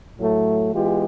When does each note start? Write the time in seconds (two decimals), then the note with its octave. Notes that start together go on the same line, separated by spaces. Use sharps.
0.17 A2 F#3 A3
0.72 E3 G#3 B3 F4 G4